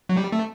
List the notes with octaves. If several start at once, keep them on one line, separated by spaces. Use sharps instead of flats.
F#3
G3
A3